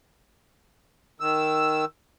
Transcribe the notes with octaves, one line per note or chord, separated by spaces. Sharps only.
D#3 E6